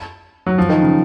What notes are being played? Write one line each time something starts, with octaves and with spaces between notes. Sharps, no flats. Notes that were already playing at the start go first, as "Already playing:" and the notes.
F#3
F3
D#3
C#3